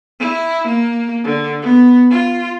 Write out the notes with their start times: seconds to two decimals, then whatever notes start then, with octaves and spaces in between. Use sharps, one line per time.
0.20 E4
0.68 A#3
1.24 D3
1.62 B3
2.10 F4